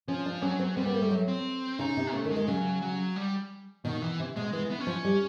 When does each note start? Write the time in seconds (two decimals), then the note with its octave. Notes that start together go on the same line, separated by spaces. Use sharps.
0.08 F3 C#4
0.26 D4
0.42 F#3 C#4
0.59 C4
0.77 G3 C4
0.86 B3
0.94 A#3
1.02 A3
1.11 F#3
1.28 C4
1.79 C#3 D#4
1.97 C3
2.13 C#3 A3
2.25 D#3
2.31 G#3
2.36 D#3
2.48 C#3 F#3
2.82 F#3
3.16 G3
3.85 B2 D#3
4.02 E3
4.19 C3
4.36 B2 G#3
4.53 E3 G#3
4.71 B3
4.79 C#4
4.87 F3
5.04 G3